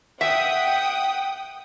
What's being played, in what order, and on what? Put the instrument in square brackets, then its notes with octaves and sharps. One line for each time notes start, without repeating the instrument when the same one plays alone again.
[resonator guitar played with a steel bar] E5 [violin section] F#5 G5 D#6